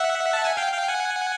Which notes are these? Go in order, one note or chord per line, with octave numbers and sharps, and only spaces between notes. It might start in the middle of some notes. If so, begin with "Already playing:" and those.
Already playing: E5 F#5
A5
G#5
F5 G5
F5 G5
F#5 G#5